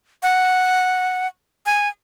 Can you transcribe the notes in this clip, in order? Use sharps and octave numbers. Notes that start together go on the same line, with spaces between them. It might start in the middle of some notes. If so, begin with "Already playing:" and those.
F#5
G#5